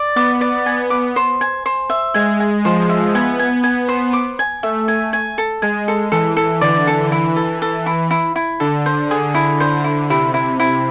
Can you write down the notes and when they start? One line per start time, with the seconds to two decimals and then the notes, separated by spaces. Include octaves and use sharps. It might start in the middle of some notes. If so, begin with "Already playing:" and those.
Already playing: D5
0.16 B3 D6
0.41 D5
0.66 B3 G#5
0.90 D6
1.16 C5
1.41 G#5
1.66 C5
1.90 E5
2.14 G#3 G#5
2.40 G#5
2.65 F3 C5
2.89 E5
3.15 B3 G#5
3.39 G#5
3.64 G#5
3.89 C5
4.13 D6
4.39 G#5
4.63 A3 E5
4.88 G#5
5.13 G#5
5.38 A4
5.62 G#3 G#5
5.88 A4
6.12 E3 A4
6.37 A4
6.61 D3 D5
6.87 A4
7.12 E3 E4
7.36 A4
7.62 A4
7.86 E4
8.11 E4
8.36 E4
8.60 D3 A4
8.86 C5
9.11 D3 G#4
9.35 E4
9.60 D3 C5
9.84 E4
10.10 C3 E4
10.34 E4
10.60 E4